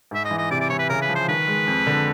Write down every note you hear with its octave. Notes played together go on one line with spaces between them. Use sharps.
G#2 E5
D#5
E3
D#5
C3 D5
D5
E3 C#5
B4
C#3 A#4
B4
F3
C5
D#3 B4
G#3
F2
D3